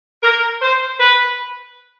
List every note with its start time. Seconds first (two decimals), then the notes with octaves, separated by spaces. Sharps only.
0.23 A#4
0.62 C5
1.00 B4